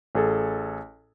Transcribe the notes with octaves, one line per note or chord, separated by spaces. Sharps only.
A1 G#4 A4